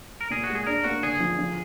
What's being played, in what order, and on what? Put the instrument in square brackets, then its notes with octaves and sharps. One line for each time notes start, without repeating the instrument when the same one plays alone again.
[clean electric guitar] A#4
[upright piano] A#2 [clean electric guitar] G#4
[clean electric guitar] F#4
[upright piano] G#3
[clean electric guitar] G#4
[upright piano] D4 [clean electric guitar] A#4
[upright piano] A#3 [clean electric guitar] F#4
[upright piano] D3 [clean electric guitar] G#4
[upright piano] F3
F3